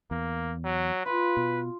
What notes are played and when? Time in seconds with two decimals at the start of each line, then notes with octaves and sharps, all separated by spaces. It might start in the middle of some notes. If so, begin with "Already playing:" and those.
0.11 E2 A#3
0.65 F#3
1.06 F4 B4
1.37 B2